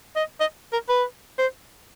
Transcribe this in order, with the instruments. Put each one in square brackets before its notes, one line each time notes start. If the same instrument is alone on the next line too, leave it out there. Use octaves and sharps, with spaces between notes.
[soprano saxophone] D#5
D#5
A#4
B4
C5